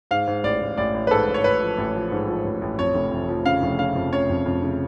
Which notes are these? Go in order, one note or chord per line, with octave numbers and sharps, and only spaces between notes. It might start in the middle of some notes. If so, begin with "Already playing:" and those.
G#2 F5
G#2
A1 D5
A1
A1 D5
A1
B4
G#2 A4
A1
C#5
A1 B4
F3
A1
F3
G#2
F3
A1
A1
F2 C#5
F1
F2
F3
C#3 F5
F1
C#3 F5
F2
C#3 C#5
F2
F2
C#3